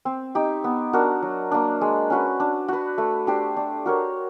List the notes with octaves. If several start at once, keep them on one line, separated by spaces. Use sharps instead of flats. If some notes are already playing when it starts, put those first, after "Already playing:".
C4
D#4 G4
B3
D4 F#4 A#4
F#3
A#3 D4
G#3
C#4 F#4 B4
D4
F#4 B4
A3
D4 G4 C5
D4
F#4 A#4 C#5